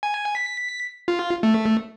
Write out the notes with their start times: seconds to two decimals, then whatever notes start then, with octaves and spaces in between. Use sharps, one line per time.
0.03 G#5
0.35 B6
1.08 F4
1.43 A3